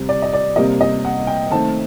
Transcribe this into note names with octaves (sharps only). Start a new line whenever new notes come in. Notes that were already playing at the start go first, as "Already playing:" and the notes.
Already playing: C3 G3 C4
D5
D#5
D5
C3 G3 A#3 D#5
D#5
F#5
G5
D#3 A3 C4 A5